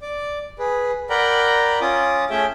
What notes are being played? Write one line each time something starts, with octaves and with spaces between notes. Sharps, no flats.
D5 D6
G#4 B4
A#4 D5 F#5 G5 A#5 B5
C#4 F4 D6 D#6
A3 C#4 G#4 E5 G5